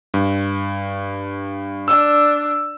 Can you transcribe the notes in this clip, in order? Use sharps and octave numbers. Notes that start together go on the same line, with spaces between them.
G2
D4 E6